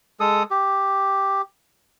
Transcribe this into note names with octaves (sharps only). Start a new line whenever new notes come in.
G#3 A4 D#6
G4